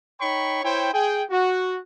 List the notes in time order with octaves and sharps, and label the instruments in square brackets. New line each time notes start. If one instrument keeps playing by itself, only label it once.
[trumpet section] D#4 C#5 G5 B5 C#6
E4 C5 C#5 G5
G#4 G5
F#4